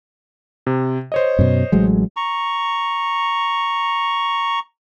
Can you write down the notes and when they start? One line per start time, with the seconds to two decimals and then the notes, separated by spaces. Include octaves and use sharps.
0.67 C3
1.12 C5 C#5 D#5
1.39 F#2 B2
1.72 A1 F#3 G#3
2.17 A#5 C#6